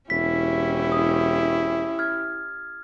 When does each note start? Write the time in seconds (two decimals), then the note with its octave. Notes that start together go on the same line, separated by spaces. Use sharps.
0.10 E1 C#4 E4 G4 B6
0.92 D#6
1.99 F6 G#6